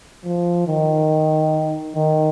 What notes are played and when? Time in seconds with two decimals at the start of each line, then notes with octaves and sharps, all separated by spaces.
0.25 F3
0.67 D#3
1.95 D#3